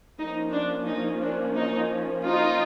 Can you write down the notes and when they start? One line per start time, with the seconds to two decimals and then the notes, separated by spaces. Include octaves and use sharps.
0.17 F3 A#3 C#4 D#4
0.51 D4
0.86 D#4
1.20 D4
1.55 D#4
2.23 D#4 F4